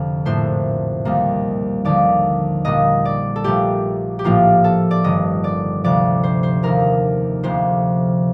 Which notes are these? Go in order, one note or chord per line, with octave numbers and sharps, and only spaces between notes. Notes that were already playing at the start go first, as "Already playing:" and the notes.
Already playing: F1 F2 D3
A#1 A2 A3 C5
D#2 D#3 G3 A#3
D#2 D3 F3 D5
A#1 A#2 G3 A#3 D#5
D5
A4
A#1 A#2 A3 G4
G4
A#1 A2 F3 A#3 F4
A4
D5
G1 G2 D#3 D#5
D5
D2 C3 F3 D5
C5
C5
F1 D#2 D#3 A#3 A#4
D2 C3 F3 A#3 C5